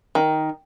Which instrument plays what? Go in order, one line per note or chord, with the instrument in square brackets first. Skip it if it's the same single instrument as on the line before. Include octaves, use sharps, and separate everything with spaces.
[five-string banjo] D#3